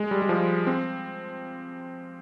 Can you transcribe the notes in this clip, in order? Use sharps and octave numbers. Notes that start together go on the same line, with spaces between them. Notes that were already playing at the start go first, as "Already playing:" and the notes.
Already playing: G#3
G3
G3
F3
C4